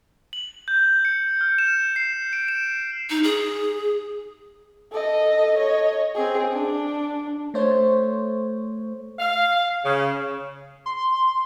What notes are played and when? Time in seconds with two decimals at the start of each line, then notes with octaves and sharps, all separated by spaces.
0.33 F#7
0.68 G6
1.05 C#7
1.41 F6
1.58 E7
1.96 C7
2.33 D7
2.48 E7
3.10 D#4
3.24 G#4
4.92 A4 D#5
5.57 C#5 D#5
6.15 C4 G#4
6.53 D4
7.54 A3 C5 C#5
9.19 F5
9.84 C#3
10.86 C6